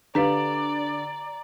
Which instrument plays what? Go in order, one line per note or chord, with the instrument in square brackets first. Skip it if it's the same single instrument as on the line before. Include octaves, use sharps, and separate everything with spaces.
[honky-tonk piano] D3 [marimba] G4 B4 F5 [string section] D5 [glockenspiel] A#5